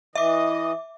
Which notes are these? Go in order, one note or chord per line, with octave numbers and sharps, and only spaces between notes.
E3 D#5 E5 D6